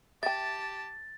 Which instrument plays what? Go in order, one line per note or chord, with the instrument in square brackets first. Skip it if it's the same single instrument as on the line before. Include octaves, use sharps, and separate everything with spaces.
[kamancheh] G4 A5 [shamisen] E5 G5 [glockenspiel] A6